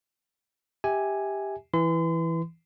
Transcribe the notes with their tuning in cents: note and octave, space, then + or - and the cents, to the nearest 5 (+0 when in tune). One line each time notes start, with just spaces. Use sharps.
G4 +5 E5 -25 G#5 +0
E3 +0 C6 -40